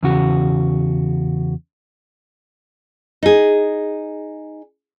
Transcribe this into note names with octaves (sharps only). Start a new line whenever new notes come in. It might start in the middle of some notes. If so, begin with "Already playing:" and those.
E2 C#3 F#4
D#4 G#4